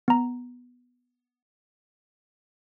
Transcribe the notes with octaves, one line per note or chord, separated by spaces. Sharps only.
B3 A#5